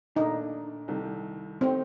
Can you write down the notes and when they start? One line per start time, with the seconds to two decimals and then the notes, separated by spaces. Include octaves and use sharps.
0.15 A#2 A3 D4 D#4
0.88 C2 C3 D#3 A3
1.61 D#3 A3 C4 D#4